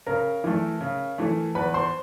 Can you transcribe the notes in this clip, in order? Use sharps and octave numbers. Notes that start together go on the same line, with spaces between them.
C#3 A#4 A#5
E3 A3
C#3
E3 A3
E2 B4 B5
C5 C6